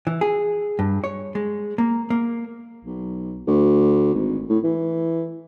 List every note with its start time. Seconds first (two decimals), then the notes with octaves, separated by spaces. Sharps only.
0.07 E3
0.21 G#4
0.79 G2
1.04 C#5
1.35 G#3
1.78 A#3
2.10 A#3
2.85 B1
3.48 D2
4.14 G#1
4.50 A2
4.64 E3